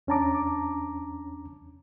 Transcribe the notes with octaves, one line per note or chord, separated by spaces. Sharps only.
E2 C#4 D4 A5 A#5 D6